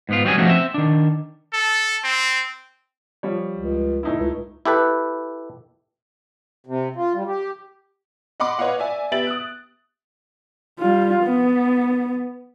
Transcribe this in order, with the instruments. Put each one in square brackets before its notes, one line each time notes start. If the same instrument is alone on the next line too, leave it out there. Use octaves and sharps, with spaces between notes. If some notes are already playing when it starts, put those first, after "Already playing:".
[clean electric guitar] G#2 B3 F4
F#3 G3 C4 C#4 F#4 G#4
F3 A3 C#4 D#4 F#4 G4
C4 E5
D#3 D4
[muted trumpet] A4
C4
[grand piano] F3 G3 C#5
[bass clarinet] C#2
[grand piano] A2 D#4 E4
[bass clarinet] C#2
[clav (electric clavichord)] E4 G4 A4 B4
[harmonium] C3
F4
G3
G4
[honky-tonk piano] D#5 F#5 B5 C6 D6
B4 C#5 D#5 F5 F#5
D5 E5 G#5
B3 G4 E5 A6 D7 F#7
D#6 F#6
[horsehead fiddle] G3 F4
B3